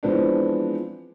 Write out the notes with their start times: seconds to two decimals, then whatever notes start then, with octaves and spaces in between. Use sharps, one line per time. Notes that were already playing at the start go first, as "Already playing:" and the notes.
0.03 E3 F3 G#3 B3 C4 D4